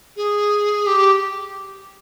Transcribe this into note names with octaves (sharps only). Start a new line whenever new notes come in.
G#4
G4